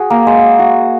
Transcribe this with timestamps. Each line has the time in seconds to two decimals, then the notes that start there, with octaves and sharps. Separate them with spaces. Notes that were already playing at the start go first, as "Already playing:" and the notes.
Already playing: F#4 G#4
0.10 A#3
0.27 G#3
0.59 F#4